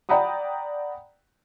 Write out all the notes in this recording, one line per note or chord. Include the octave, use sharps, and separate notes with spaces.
D5 F#5 G5 A#5 B5 D#6